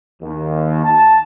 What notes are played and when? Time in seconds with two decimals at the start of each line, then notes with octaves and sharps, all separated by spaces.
0.23 D#2
0.83 A5